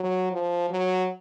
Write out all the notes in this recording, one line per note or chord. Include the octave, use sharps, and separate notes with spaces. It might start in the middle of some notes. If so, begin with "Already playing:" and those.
Already playing: F#3
F3
F#3